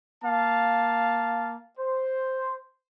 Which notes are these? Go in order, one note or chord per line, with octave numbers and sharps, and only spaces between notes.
A#3 F5 A5
C5